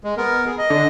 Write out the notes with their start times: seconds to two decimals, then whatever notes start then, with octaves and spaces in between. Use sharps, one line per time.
0.04 G#3
0.17 B3 A#4
0.46 G#4
0.58 D#5
0.70 D3